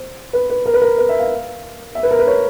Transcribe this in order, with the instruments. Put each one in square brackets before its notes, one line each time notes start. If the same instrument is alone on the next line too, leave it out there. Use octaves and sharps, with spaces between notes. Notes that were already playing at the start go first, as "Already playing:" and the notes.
Already playing: [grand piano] C5
B4
B4
A#4
B4
A#4
B4
E5
F5
E5
B4
A#4
B4
C#5